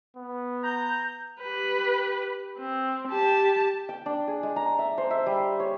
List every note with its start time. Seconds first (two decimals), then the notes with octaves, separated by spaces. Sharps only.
0.17 B3
0.64 A#5 G6
1.41 G4 B4
2.58 C4
3.07 G4 A5
3.89 G5
4.06 D4
4.28 G#4
4.43 G#3
4.56 A#5
4.79 E5
4.98 C5
5.11 E5
5.26 G3
5.60 C#5